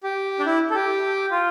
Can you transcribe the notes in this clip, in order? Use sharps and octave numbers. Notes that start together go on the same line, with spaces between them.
G4
D4
E4
A4
G4
F4